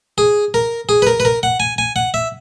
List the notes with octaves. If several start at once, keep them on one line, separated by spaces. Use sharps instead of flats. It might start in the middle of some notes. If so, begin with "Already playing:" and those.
G#4
A#4
G#4
B4
A#4
B4
A#4
F#5
G#5
G#5
F#5
E5